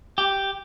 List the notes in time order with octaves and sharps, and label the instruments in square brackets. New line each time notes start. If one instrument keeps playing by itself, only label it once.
[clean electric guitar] G4